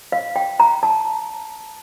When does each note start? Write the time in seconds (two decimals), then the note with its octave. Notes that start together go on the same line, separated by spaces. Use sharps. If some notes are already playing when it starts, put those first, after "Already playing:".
0.12 F5
0.36 G5
0.60 A#5
0.83 A5